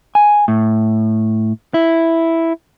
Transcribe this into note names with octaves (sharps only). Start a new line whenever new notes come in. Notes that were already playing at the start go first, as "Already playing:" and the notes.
G#5
A2
E4